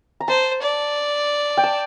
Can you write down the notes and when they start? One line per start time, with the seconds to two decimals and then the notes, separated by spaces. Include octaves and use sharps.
0.20 A#5
0.28 C5 A5
0.62 D5
1.57 G5
1.64 A5